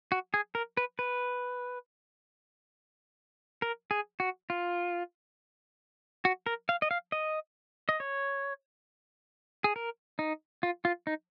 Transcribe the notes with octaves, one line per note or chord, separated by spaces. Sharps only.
F#4
G#4
A#4
B4
B4
A#4
G#4
F#4
F4
F#4
A#4
F5
D#5
F5
D#5
D#5
C#5
G#4
A#4
D#4
F4
F4
D#4